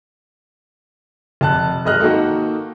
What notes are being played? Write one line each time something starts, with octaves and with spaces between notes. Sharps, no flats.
F1 A5 F#6
G#1 G#3 D#5 F6 F#6
D#3 A#3 F#4 A4 D#5